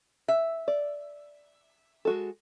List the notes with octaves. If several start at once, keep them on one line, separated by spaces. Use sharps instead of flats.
E5
D5
G#3 F#4 A4